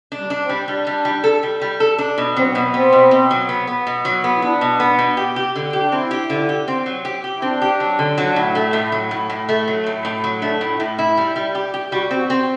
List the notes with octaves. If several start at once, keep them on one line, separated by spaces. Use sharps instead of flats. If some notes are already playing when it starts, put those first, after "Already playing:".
D4
G3
D4
C4
G3
G3 D4
G3
G3
A4
G3
G3
A4
D4
B2 D4
F#3 C4
B2 B3
B3 C4
B2
B2
F#3
B3
B3
B2
F#3
B3
E4
B3 D4
B2
B3
B2
G4
G4
D3
G4
D4
C4 E4
G4
D3
G4
C4
F#3
G4
G4
E4
C4 D4
G4
F#3
D3
F#3
A2
A3
A2
F#3
A2
A2
A3
F#3
A2
A2
F#3
A3 D4
A2
E4
A2
E4
G3
G3
G4
G4
G3 F#4
C4
F#4
C4